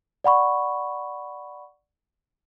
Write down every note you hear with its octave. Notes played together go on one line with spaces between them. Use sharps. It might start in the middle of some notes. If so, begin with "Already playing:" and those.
D5 F#5 B5 C#6